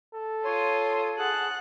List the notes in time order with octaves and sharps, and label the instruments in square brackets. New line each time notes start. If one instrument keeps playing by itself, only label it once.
[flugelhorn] A4
[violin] F4 D#6 [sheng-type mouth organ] C#5 C6
[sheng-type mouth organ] G#4 A5 [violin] F#5 F#6